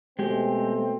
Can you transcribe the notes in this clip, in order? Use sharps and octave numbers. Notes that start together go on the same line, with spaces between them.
B2 G#3 A3 C4 G4